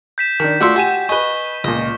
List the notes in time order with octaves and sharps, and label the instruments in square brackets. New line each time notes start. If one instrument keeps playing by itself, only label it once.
[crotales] G6 B6 E7
[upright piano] D#3 D4 [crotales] G6
[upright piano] A3 F4 F#4 [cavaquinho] D5 E5 C6
[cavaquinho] F#4 [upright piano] G4 G#5 E7
[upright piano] B4 G#5 [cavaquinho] D#5 [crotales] C#6 G7
[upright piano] C#2 A#2 [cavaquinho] D#5